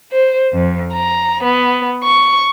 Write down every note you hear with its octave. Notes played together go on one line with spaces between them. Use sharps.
C5
F2
A#5
B3
C#6